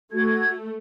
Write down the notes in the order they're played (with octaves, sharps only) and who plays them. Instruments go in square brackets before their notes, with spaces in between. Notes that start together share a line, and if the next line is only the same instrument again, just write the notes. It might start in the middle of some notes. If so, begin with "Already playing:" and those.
[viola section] A3 [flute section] F#4 G#6